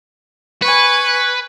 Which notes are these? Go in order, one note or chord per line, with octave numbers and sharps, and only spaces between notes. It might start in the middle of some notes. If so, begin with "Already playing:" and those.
B4 G#5 C#6